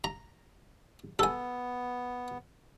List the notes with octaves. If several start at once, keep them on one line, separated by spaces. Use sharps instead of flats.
A#5
B3 A4 G#5